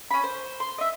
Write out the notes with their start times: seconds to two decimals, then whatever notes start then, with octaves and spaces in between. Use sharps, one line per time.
0.11 C#4 B5
0.23 C5
0.60 C6
0.78 D#5 E5